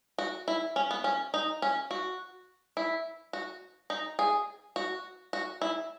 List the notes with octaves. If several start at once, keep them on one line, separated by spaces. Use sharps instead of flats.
F#4
E4
C#4
B3
C#4
D#4
C#4
F#4
E4
F#4
D#4
G#4
F#4
F#4
E4